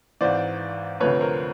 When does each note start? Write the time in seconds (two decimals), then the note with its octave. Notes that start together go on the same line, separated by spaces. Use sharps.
0.21 G#1 G#2 E3 C5 D5
1.00 D2 C3 F3 A3 B4 C#5
1.21 A#4 C5